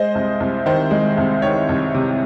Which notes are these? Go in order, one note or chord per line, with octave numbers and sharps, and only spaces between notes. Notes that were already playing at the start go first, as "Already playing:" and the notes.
Already playing: G#3 C5 D#5
C2
C2
D#3 C5
G#3
C2
D#3 C#5
C2
C3